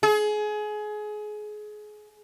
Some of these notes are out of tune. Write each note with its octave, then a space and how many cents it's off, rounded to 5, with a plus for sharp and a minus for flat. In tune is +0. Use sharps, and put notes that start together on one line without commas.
G#4 +25